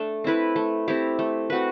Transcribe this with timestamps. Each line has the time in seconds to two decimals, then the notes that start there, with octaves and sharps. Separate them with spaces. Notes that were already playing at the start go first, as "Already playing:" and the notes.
Already playing: A3 D4 A4
0.24 C4 E4 B4
0.56 A3
0.88 C4 E4 G4
1.19 A3
1.50 C4 F#4 B4